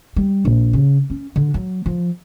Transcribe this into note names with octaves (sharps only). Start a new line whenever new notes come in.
G3
A#1
C#3
C#4
D3
F#3
F3